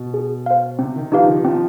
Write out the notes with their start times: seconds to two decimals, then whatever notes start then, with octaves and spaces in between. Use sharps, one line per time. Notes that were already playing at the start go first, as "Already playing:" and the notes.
Already playing: B2
0.14 G#4
0.46 C5 F5
0.79 C3 C4
0.96 D#3
1.12 F3 D#4 G4 B4 F5
1.28 D#3
1.44 F3 C4